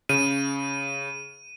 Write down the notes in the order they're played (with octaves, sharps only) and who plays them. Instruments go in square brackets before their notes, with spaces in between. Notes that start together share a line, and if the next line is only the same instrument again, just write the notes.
[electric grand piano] C#3 [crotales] D#7